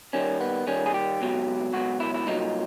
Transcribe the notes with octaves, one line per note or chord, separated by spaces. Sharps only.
D#2 D#3 G3 C#4
B3
D#2 D#3 G3 C#4
G#4
G4
C#2 B2 F#3
C#2 B2 F#3 F#4
E4
E4
C2 A#2 F#3 D#4